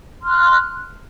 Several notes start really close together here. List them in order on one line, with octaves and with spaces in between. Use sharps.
C6 F6 F#6